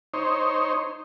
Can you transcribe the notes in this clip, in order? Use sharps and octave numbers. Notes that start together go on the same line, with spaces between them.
D#4 C5 C#5